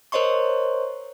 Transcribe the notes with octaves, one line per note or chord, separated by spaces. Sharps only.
A#4 C5 C#5 D#5 C6 C#6